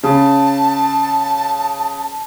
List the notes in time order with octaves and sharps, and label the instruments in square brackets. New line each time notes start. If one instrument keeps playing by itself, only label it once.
[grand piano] C#3 [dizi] A5